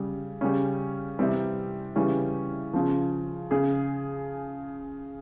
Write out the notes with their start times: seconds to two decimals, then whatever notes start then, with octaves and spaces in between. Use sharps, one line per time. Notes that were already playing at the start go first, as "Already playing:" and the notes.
Already playing: C#3 G3
0.41 C#3 G3 C#4
1.19 C3 E3 G3 C4
1.96 C#3 E3 G3 C#4
2.73 C#3 F3
3.51 C#3 G#4